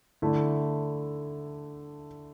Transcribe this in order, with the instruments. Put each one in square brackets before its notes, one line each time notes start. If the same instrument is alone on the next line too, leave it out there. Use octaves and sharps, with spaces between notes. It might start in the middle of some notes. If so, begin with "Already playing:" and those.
[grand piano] D3 A3 E4